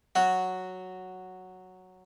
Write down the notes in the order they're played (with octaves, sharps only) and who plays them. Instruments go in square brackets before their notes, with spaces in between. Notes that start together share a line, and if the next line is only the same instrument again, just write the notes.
[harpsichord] F#3 F#4